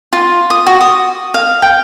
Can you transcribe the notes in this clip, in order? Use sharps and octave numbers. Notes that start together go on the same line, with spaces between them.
F4
D#6
F#4
D#6
F5
G5